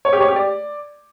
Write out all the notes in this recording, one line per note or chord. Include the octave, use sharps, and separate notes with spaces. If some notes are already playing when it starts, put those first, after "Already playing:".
C#5
G4
C#5
G4
D5